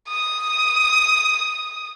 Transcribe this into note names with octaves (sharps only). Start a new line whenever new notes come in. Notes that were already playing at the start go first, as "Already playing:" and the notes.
D#6